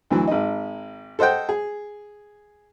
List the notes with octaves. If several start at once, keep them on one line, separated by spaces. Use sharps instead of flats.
D2 E3 F#3
G#1 D#4
A4 C5 D#5 F#5 G5
G#4